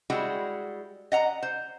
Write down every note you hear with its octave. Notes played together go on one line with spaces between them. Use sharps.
G3 G#3 E4 F#4
D#5 F#5 A#5
C5